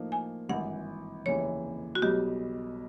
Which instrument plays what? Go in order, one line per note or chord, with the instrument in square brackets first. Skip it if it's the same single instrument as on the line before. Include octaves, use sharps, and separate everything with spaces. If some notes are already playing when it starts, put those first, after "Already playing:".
Already playing: [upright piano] A2 F3 A#3 D#4
[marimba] G#5
[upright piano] G#1 G2 E3 [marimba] F#5
[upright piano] F1 D#2 C#3 E3 [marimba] C#5
[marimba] F#4
[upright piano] B1 B2 G3 [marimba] G4